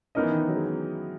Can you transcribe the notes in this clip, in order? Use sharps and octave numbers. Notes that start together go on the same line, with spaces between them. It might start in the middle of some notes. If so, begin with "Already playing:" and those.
B3 C#4 D#4 A#4 D#5
E3
D#3
E3
F#3
G#3
B3